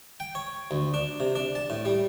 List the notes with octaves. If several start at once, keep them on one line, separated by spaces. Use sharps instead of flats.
G5
C#5
D2
D4
C3
D4
A5
A2
G3